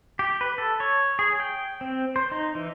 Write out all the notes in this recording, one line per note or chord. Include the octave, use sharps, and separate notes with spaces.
G4
B4
A4
C#5
G#4
G5
C4
C5
D#4
E3